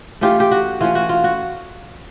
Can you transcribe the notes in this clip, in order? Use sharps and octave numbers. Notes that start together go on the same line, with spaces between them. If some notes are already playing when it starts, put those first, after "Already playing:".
E3 A3 C#4 F4 G4
G4
F#4
E3 A3 C#4 F4
F#4
F4
F#4